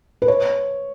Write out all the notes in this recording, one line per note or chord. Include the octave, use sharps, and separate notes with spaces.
B4
C#5